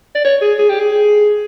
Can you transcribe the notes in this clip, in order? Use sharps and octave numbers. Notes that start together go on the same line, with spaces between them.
D5
C#5
G#4
G#4
G4
G#4